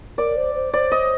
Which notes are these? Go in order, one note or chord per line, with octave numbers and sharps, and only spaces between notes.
A#4 D5
C5
C5
C5 D5
D#5